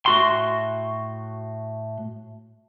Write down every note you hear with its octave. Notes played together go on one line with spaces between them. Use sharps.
A2 F#4 C6